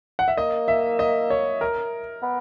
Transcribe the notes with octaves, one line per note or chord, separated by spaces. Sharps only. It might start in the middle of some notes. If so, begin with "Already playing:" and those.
F#5
E5
A#3 D#5
E5
D#5
C#5
A#4
B3